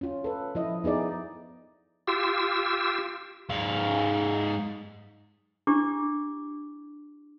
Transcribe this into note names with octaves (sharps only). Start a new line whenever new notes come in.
C#4 F4
A4 B4
F3 E4 D#5
B3 D#4 G#4 D5
F4 G4 E6
G#2 F5
D4 E4 G4 C#6 D6